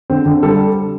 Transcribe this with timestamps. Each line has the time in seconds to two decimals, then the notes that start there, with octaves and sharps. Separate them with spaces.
0.10 D3 C4
0.26 D3
0.42 G3 A4